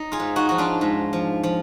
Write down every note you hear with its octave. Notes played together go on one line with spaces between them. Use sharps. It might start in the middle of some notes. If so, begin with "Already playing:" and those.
Already playing: D#4
F4 G#4
G#2
D#4 F#4
F3 F#4
D4 F4
G#2
F3
F3